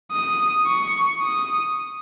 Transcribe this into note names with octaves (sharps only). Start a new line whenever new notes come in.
D#6
C#6
D#6